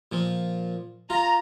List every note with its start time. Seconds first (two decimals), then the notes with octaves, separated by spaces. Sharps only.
0.12 A#2 F3
1.10 F4 A#5